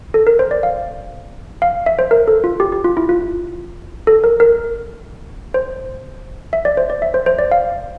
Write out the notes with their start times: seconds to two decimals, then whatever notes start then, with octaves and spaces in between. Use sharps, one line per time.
0.14 A4
0.27 A#4
0.39 C5
0.51 D5
0.63 F5
1.62 F5
1.86 E5
1.99 C5
2.11 A#4
2.28 A4
2.44 F4
2.60 G4
2.72 G4
2.84 F4
2.97 E4
3.09 F4
4.07 A4
4.24 A#4
4.40 A#4
5.54 C5
6.53 E5
6.65 D5
6.77 C5
6.90 D5
7.02 E5
7.14 C5
7.26 C5
7.39 D5
7.51 F5